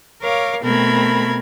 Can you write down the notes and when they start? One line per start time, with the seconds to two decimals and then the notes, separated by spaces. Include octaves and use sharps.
0.22 A#4 C#5 F5 D6
0.62 B2 A3 C4 A#4 B5 G#6